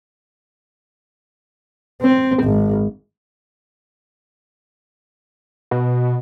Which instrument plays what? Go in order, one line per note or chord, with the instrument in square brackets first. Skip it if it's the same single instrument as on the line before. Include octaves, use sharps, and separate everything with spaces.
[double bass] C4
G#1
[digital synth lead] B2